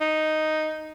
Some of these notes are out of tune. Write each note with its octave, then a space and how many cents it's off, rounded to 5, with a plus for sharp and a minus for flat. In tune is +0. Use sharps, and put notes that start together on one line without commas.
D#4 +0